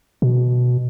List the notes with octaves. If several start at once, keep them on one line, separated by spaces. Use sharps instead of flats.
B2